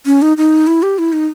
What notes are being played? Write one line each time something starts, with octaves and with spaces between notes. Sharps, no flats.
C#4
D#4
D#4
E4
G4
E4
D#4